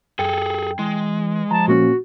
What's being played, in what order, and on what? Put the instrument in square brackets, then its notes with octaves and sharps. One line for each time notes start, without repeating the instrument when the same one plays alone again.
[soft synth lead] F#2 [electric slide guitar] G#4 A4 [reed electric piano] G5
[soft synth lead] E3 [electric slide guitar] G#3
[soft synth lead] F3 [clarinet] A5 [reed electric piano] A#5
[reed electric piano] A#2 A#3 C#4 [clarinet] F#4